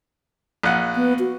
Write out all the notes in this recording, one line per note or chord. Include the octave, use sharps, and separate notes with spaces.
A#1 F#5
B3
F#4